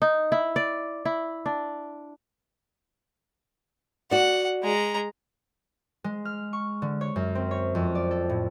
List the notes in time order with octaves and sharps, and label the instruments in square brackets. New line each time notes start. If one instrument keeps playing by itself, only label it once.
[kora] D#4
E4
D5
E4
D4
[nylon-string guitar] F#4 D5 [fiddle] F#5
[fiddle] G#3 A#5
[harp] G#3
F6
C#6
D3
C#5
F#2
C4
C#5
F2
D5
A4
A2